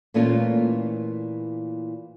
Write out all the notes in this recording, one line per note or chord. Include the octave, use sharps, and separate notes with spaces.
A#2 E3 A3 A#3 C#4 F4